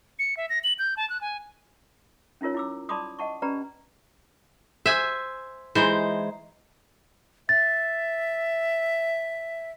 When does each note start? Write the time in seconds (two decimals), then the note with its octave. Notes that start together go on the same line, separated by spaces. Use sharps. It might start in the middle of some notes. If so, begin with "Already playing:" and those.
0.19 C#7
0.37 E5
0.49 A#6
0.64 F#7
0.79 G6
0.97 A5
1.10 F#6
1.21 G#5
2.41 C#4 D#4 F4 A#4 C#5
2.54 E4 D6 E6
2.89 D5 A5 B5 C6 D6 D#6
3.19 D#5 F#5 A5 C#6
3.42 C#4 G4 B4 D5 A#5 B5
4.86 C5 E5 G#5
5.75 E3 G#3 D#4 C5
7.49 E5 A6